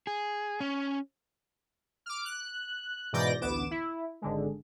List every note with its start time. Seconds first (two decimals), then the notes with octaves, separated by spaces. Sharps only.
0.07 G#4
0.61 C#4
2.06 D6 F6
2.25 F#6
3.13 G#2 B2 E3 D5 G6 A#6
3.41 A1 D2 B3 D6 E7
3.71 E4
4.22 G#1 D3 G#3